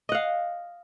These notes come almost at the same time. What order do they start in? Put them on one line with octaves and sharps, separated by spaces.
D#5 F#5 F5